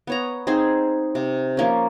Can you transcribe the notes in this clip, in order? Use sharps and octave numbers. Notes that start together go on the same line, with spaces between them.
B3 C#5 A#5
C4 D#4 G#4 C5
C3
F3 A#3 C#4